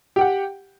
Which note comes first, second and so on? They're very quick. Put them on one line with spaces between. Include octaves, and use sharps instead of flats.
G4 G5 F#5